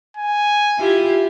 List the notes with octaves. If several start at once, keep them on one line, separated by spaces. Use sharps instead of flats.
G#5
E4 F4 G4